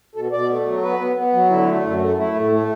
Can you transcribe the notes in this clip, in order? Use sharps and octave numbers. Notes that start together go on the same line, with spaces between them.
B2 A4
B2 D5
A3
F#3
B3 B4
B3
B3
F#3
D3 E4
A3
F#2
A3
A3 E4
A2
A3